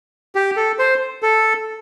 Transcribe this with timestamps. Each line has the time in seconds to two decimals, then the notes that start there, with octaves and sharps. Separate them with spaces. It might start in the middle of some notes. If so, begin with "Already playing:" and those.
0.35 G4
0.56 A4
0.79 C5
1.23 A4